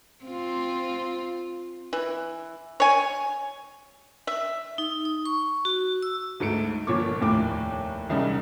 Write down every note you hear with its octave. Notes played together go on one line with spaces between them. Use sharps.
C4 F4
E3
C#5 G#5
E5
D#4
D#6
C#6
F#4
E6
D2 G#2 A3 C#7 D7
G1 A#2 F3 C#5 C#6 D6
F1 D#2 A2 D6
E1 C2 C#3 G3 D#4